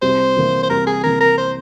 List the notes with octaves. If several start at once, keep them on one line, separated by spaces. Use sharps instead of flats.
C2 C5
C3 E3 A#3
C5
C2 A#4
G#4
C3 E3 A#3 A#4
A#4
C5